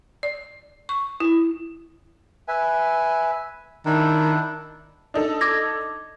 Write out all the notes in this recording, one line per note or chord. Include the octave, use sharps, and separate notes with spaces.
D5
C#6
E4
B4 E5 G#5
D#3 D4 E4
D4 D#4 A4
D6 G#6 A#6